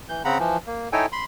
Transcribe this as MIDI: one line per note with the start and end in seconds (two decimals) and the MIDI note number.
0.09 0.22 52
0.09 0.22 91
0.25 0.38 49
0.25 0.38 60
0.25 0.38 78
0.25 0.38 82
0.25 0.38 83
0.39 0.57 52
0.39 0.57 53
0.67 0.89 58
0.93 1.06 63
0.93 1.06 64
0.93 1.06 69
0.93 1.06 73
0.93 1.06 79
0.93 1.06 80
1.12 1.25 83
1.12 1.25 84